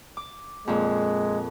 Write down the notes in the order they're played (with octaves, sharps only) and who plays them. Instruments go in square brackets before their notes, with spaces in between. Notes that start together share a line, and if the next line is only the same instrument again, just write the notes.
[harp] D6
[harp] F2 A#2 [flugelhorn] G#3